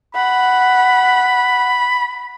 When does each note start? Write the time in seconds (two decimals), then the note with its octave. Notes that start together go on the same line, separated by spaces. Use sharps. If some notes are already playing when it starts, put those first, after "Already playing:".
0.15 F#5 B5